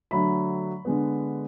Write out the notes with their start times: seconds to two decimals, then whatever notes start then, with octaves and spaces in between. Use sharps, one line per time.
0.11 D3 F#3 A3 B5
0.85 D3 G#3 B3